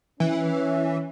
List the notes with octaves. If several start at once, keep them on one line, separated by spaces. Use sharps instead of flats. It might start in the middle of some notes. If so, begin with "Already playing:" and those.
E3 C#4